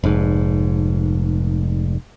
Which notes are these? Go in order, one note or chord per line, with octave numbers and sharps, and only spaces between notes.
F1 G#2